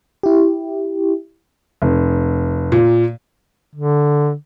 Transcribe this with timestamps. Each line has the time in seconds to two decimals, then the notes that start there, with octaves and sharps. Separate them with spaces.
0.23 E4 G4
1.82 F1
2.72 A#2
3.75 D3